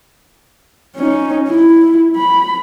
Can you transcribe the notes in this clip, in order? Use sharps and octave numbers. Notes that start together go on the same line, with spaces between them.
C#4 D#4
E4
B5